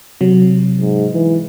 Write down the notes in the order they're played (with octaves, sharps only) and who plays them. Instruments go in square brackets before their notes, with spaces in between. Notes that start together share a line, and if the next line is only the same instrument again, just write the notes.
[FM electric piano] C3 F#3
[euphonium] G#2
E3